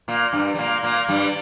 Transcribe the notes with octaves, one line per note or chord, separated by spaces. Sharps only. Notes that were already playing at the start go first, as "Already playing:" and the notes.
A#2 A#3
G2 G3
G3
A#2 A#3
A#2 A#3
G2 G3